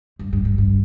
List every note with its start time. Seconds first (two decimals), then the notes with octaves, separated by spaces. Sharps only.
0.19 G2
0.33 G2
0.45 G2
0.58 G2